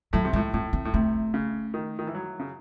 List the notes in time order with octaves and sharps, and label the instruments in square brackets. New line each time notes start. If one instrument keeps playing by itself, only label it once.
[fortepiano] A2 [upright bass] F#3
[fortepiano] C3
[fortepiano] A2 [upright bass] G#3
[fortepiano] A2 [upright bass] C4
[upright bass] C4
[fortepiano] A2
[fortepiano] C3 [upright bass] A3
[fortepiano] C#3
D#3
D#3
E3
F#3
C#3